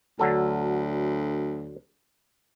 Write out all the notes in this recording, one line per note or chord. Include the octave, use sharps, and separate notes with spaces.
D2 D3 F#3 A4